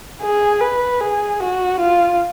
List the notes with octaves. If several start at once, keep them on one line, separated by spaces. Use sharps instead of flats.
G#4
B4
G#4
F#4
F4